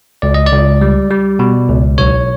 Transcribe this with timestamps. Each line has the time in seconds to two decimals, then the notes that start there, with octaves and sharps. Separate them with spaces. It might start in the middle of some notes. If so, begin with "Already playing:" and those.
0.22 C#2 D5
0.34 D#5
0.46 D5
0.52 C#2
0.81 G3
1.11 G3
1.39 B2
1.69 C#2
1.98 B1 C#5